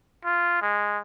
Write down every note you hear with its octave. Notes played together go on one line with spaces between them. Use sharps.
F4
G#3